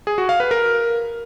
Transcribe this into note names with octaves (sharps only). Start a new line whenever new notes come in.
G#4
F#4
F5
B4
A#4